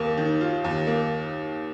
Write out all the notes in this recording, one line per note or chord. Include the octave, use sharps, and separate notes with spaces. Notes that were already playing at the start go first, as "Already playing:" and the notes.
Already playing: D#2 A#3
D#3
F4
D#2
A#3